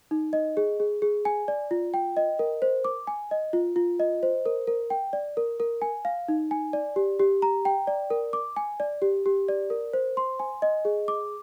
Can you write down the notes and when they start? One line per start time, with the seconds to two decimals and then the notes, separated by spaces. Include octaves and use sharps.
0.11 D#4
0.33 D#5
0.57 G#4
0.80 G#4
1.02 G#4
1.25 G#5
1.48 D5
1.71 F4
1.94 G5
2.17 D#5
2.39 A#4
2.62 C5
2.85 D6
3.07 G#5
3.31 D#5
3.53 F4
3.76 F4
4.00 D#5
4.23 C5
4.46 A#4
4.67 A#4
4.90 G5
5.13 D5
5.37 A#4
5.60 A#4
5.82 G#5
6.05 F5
6.28 D#4
6.51 G#5
6.73 D5
6.96 G4
7.19 G4
7.42 A#5
7.65 G5
7.87 D5
8.10 A#4
8.33 D6
8.56 G#5
8.80 D5
9.02 G4
9.26 G4
9.49 D5
9.70 A#4
9.93 C5
10.17 C6
10.39 G#5
10.62 D#5
10.85 G#4
11.08 D6